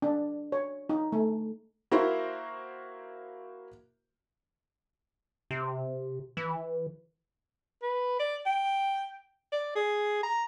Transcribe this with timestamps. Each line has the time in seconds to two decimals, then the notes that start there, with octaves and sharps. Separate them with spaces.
0.02 D4
0.52 C#5
0.89 D#4
1.12 A3
1.91 A#3 E4 F#4 A#4 C5
5.51 C3
6.37 E3
7.82 B4
8.20 D5
8.46 G5
9.52 D5
9.76 G#4
10.23 A#5